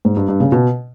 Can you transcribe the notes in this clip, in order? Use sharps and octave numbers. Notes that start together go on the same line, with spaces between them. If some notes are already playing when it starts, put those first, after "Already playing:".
G#2
G2
G2
C#3
B2